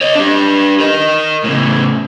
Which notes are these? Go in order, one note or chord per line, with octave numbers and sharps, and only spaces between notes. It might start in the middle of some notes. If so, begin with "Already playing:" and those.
C#5 D#5
D4 G4
A#4 D#5
A2 C#3